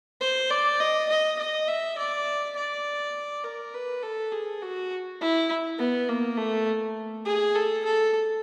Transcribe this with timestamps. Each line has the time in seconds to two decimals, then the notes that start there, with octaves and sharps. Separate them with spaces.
0.21 C5
0.51 D5
0.80 D#5
1.10 D#5
1.39 D#5
1.68 E5
1.98 D5
2.56 D5
3.44 A#4
3.74 B4
4.02 A4
4.32 G#4
4.62 F#4
5.21 E4
5.78 B3
6.09 A#3
6.37 A3
7.25 G#4
7.55 A4
7.85 A4